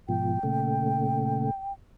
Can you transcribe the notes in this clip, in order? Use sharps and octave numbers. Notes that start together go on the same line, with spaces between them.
G#2 B2 F3 G5
A#2 C#3 A3